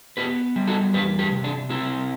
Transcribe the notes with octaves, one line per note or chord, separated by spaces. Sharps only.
B3 G4 B4
G3
F#4 A4
E2 G4 B4
G4 B4
C3
D4
C4 E4